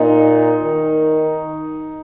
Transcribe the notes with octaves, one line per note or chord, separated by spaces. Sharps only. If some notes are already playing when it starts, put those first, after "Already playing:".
Already playing: A#2 D#4
D#3